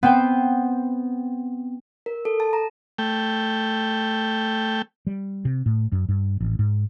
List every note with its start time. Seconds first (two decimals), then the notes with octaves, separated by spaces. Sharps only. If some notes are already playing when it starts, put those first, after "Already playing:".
0.03 B3 C4 C5 G5
2.06 A#4
2.25 A4
2.40 A5
2.53 A#5
2.98 A3 G5
5.07 G3
5.45 C3
5.66 A2
5.92 F#2
6.09 G2
6.40 A1
6.59 G#2